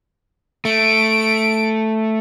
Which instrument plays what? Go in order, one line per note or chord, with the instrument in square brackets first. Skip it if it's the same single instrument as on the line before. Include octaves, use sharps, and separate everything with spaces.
[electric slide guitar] A3 [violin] D7